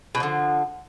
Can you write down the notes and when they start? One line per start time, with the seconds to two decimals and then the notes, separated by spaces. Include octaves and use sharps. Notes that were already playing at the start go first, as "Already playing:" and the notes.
0.15 B2
0.17 F#3
0.20 F3
0.23 D3